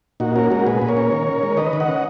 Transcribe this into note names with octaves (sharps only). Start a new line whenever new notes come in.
A#2 D#4 F#4
C#4 F#4 A#4
G#3 F#4 A#4
A#2 G#4 B4
A#2
A#4 C#5
C#4
D#3
C#4
G#3
D#3 B4 D#5
D#3
D#5 F#5
C#4